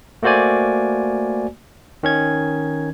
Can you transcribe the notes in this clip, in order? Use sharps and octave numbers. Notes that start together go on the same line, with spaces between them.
A3 A#3 F#4 C5 D5 G#5
D#3 C#4 G#6